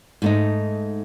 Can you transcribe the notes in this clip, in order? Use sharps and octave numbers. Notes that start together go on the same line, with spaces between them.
G#2 A3 D#4